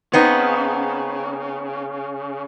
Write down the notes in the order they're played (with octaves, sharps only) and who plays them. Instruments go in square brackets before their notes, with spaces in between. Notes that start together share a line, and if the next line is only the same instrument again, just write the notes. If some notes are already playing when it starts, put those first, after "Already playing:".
[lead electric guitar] C#3 [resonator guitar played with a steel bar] B3 C4 D#4